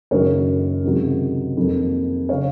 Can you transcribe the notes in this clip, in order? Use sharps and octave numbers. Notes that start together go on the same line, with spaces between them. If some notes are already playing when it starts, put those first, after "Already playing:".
F#1 F#2 D#3 F#3 A#4 C#5
C#2 C3 D#3 F#3
F2 D#3 F#3 A#3
C#3 C#5 F5